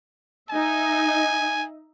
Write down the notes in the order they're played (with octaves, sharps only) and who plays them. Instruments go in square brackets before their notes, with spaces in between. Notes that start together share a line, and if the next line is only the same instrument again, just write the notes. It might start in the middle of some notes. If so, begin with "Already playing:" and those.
[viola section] D#4 D#5 E5 [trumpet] G#5